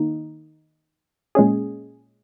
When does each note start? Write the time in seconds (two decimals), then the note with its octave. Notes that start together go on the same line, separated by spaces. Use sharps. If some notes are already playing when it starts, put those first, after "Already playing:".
Already playing: D#3 A#3 D#4
1.35 A#2 G#3 C#4 G#4